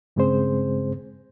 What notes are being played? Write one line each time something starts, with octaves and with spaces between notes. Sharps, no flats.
G2 C#3 G#3 C4 G#4 C5